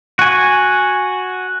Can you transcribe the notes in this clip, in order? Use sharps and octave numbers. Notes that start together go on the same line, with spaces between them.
F#4 G#5